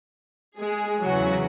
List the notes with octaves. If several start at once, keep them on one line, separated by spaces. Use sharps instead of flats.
G#3 G#4
E2 C#3 E3 F#3 F#4